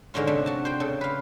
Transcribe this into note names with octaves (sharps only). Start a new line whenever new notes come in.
G#2 D3 G#3 C#4 F4
C3 A3 D4
F#4 A5
C5 G5
C#3 A4
B4 F5